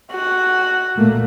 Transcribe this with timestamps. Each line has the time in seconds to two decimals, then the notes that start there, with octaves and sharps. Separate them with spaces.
0.12 F#4
0.96 A#2 A3 A#3